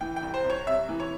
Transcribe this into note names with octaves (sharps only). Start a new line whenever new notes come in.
E3 G5
G5
C2
C5
C2
C#5
C3 E5
E3
C#5